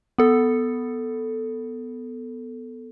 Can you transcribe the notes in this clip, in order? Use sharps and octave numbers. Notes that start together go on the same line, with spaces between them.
B3 A4